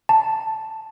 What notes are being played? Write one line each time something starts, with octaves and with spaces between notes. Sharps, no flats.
A5